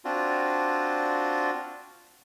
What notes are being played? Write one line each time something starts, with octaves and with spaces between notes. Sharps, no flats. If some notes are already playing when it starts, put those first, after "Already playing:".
C4 D4 F4 F#4